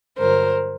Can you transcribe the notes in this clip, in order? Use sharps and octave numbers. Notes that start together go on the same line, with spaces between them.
G2 D3 F#3 A#4 C5